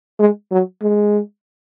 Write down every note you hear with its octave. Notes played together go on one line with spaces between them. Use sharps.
G#3
F#3
G#3